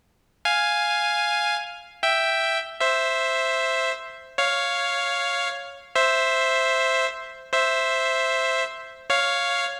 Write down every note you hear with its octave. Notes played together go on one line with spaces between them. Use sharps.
F5 G#5
E5 G5
C5 E5
C#5 F5
C5 E5
C5 E5
C#5 F5